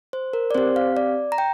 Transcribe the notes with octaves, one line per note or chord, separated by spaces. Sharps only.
C5
A#4
D5
C4 G4 C5
F5
D5
A#5
G5